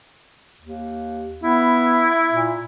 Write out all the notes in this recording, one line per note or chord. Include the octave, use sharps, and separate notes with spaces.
D#2
B3 E4
A#2